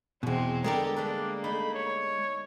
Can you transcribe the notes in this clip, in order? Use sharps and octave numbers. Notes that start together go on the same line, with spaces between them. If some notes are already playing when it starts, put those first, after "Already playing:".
E2 B2 G#3 C4
D3 G3 G#3 B3 G4 A4 A#4 A#5
G3 A#3 D4 B4
A3 D#4 B5
C#5